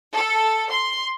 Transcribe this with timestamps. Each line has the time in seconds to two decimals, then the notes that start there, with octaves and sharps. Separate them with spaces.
0.13 A4
0.70 C6